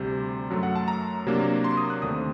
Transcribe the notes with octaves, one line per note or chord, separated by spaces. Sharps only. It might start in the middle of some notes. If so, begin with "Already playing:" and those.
Already playing: D2 C3 G3 C5
F#2 F#3 A3
F#5
A5
A#5
C3 F#3 A#3 D4
C6
D#6
F#6
D#2 D3 A3 C4 D#6